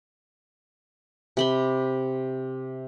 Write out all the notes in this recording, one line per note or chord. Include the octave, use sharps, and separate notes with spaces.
C3 B5 C6